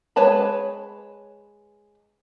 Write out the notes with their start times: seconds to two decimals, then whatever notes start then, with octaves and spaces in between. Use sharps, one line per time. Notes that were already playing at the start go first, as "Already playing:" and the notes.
0.16 G#3 B4 C#5 A5 B5